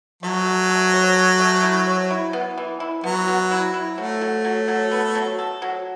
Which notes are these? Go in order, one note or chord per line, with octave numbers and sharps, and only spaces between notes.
F#3 A3
A3
A3
C#5
A3
A3
E4
C#5
E4
B3
E3
E4
F#3 B3
B3
E4
E4
F#3 A3
F#3
F#3
F#3
B3
F#3
A4
F#3